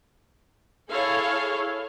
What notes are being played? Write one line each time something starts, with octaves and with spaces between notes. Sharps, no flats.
E4 G#4 A4 C#5 F5